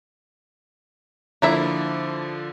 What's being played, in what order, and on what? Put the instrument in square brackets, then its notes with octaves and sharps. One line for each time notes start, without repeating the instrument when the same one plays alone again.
[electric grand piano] D3 F3 [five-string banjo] A#3 E4 E5